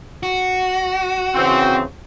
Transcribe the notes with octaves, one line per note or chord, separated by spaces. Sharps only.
F#4
C#3 E3 C4